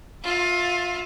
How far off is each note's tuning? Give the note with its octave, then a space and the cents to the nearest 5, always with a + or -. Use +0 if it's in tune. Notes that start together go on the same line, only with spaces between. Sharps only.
F4 +20 E5 +0